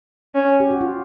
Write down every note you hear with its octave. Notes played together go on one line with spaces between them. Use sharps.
C#4
G4
F#4
F4